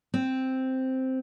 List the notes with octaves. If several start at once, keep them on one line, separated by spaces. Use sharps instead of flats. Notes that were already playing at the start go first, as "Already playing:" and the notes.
C4